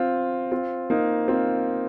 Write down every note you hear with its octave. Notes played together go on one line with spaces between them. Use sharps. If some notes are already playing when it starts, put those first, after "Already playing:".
Already playing: C4 F4
C4 F4
A#3 D#4
C4 F4